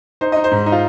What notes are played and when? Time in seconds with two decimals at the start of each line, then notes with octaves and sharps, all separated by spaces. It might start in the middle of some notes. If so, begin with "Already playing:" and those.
0.21 D#4 C5
0.32 D#4 D#5
0.44 C5
0.51 G#2
0.66 D#4
0.72 F4